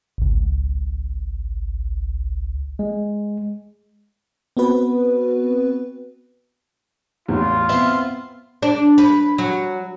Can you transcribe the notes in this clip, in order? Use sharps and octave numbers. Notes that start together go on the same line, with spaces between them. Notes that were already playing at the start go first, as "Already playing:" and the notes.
G#1 C#2
G#3
B3 C4 F#4 B4
A1 E2 F4
B3 C4 C5 E5
D4
B4
F#3